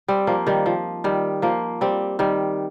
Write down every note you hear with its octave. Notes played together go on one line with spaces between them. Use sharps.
G3 C4
F3 A#3
D#3 G3
F3
D#3 G3
F3 A#3
G3 C4
D#3 G3